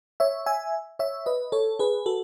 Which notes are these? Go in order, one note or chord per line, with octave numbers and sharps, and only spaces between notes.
C#5 E5
E5 G#5
C#5 E5
B4 D#5
A4 C#5
G#4 B4
F#4 A4